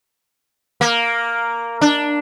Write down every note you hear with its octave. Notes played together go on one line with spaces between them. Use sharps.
A#3
D4